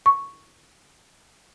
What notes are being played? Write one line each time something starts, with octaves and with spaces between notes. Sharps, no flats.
C#6